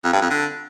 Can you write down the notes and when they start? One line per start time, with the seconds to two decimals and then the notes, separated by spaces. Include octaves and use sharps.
0.05 F2
0.13 G2
0.21 F2
0.30 D3